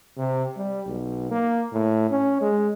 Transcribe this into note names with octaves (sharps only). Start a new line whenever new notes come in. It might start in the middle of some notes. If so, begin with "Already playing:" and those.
C3
G3
B1
A#3
A2
C#4
G#3